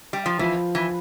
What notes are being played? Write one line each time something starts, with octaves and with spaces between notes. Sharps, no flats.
G3
F3
E3 F3
E3